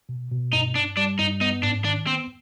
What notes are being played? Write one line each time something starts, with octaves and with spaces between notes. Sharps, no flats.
B2
B2
G2 D#4
G2 D4
G3 D4
G2 D#4
B3 D#4
G#2 D4
D#3 D4
B3 C4